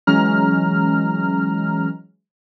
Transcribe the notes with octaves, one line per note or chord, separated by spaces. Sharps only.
E3 F#3 G#3 C#4 A#5 F6